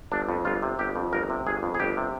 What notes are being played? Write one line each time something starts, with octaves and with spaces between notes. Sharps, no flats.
G1 D4
F2
G1 F4
C3
G1 G4
F2
G1 A#4
C3
G1 G#4
F2
G#4
G1 G4
C3